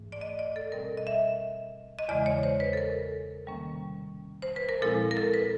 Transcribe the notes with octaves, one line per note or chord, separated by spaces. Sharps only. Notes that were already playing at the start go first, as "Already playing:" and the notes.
Already playing: G#2 E3 A3
D5
D#5
D5
A4
B2 G3 C4 A#4
D#5
E5
D#5
E2 C#3 E3 G#3 D5
C#5
C5
B4
A4
A#4
C3 D#3 G3 A#3 C#4
C5
B4
A#4
A#2 F3 G#3 C4 E4 A4
A#4
A4
B4